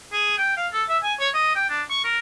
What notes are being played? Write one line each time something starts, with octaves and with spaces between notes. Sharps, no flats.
G#4
G5
F5
A4
E5
G#5
C#5
D#5
G5
D4
C#6
A#4